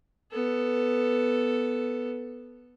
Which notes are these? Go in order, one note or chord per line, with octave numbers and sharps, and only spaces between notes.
B3 A4